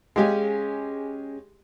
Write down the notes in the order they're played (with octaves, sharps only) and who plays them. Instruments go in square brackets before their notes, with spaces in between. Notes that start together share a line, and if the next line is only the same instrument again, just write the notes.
[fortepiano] G#3 G4 [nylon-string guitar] C#4 G#4 F5